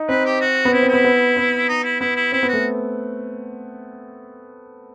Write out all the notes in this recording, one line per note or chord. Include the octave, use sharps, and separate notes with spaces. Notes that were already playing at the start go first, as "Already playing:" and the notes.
Already playing: D#4
C4 B4
G4
F#4
B3
C4 E4
C4
E4
B3
B3
B3
D#4
E4
B3 E4
E4
C4 E4
B3
F#4
A3